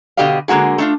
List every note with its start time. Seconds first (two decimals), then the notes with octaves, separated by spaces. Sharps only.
0.17 B2 D3 G4 D5 D#5 F5
0.48 D3 G#3 A#3 F#4 G#4
0.78 A3 D4 F4